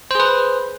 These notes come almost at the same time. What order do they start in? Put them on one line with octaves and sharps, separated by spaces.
C5 G#4 B4